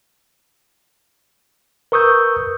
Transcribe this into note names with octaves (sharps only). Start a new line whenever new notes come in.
A#4 B4 C#6 D#6 E6 G6